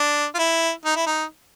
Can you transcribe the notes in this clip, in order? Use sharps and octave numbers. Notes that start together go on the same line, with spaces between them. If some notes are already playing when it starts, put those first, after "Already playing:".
Already playing: D4
F4
E4
D#4
E4
D#4